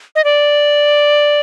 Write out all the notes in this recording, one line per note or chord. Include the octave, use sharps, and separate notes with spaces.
D#5
D5